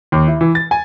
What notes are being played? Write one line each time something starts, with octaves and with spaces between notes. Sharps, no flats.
D#2
E4
E3
A6
G#5